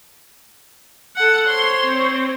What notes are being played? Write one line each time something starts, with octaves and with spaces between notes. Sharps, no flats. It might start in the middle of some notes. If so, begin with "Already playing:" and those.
A4 F#5
C5 C#5 C6
C4